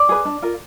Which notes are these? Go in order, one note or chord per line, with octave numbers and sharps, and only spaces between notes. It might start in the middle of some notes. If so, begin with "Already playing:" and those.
Already playing: D5
G#4 B4
D4
F4 A#4